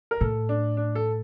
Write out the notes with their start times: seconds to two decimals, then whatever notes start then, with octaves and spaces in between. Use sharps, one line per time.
0.11 A#4
0.21 A2 A4
0.49 D4
0.77 D4
0.95 A4